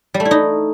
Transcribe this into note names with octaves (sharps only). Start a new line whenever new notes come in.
G3
A3
E4
D#4